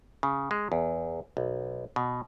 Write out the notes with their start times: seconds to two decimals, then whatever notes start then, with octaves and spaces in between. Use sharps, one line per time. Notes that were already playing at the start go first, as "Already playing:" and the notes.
0.23 C#3
0.51 G#3
0.72 E2
1.37 B1
1.96 B2